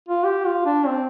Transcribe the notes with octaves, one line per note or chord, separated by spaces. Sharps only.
F4
G4
F4
D4
C4